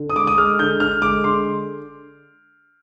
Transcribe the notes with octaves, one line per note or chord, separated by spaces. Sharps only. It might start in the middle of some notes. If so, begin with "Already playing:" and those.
Already playing: D3
D#6
G#3 D6
D#6
G#3 F6
D3 G6
D3 F6
G#3 D6
D3 C6